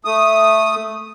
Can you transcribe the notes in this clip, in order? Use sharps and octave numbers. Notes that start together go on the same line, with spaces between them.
A3 D#6